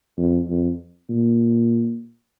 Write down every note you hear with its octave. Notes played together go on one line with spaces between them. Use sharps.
F2
F2
A#2